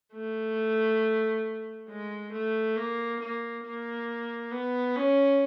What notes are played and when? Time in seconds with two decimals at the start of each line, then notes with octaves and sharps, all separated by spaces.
0.13 A3
1.89 G#3
2.32 A3
2.76 A#3
3.20 A#3
3.64 A#3
4.52 B3
4.96 C#4